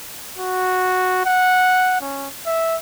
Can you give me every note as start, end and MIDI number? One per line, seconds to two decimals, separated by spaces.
0.38 1.25 66
1.26 1.96 78
2.01 2.28 61
2.46 2.76 76